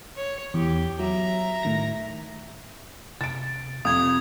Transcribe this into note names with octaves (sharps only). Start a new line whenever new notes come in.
C#5
E2 G4
F#3 E5 A#5
A2 D#3 A#6
C3 A6 D7
F2 C3 D#6 G#6